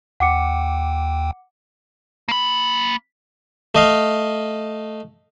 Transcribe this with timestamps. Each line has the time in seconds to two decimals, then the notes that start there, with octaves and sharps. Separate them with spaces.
0.20 D#2 F#5 G5 D6 C#7
2.28 A#3 B5
3.75 A3 D#5 F5